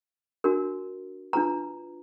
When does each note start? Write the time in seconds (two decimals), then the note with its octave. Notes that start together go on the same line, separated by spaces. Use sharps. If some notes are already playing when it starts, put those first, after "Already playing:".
0.44 D4 F#4 A#4
1.33 D4 F4 B4 A#5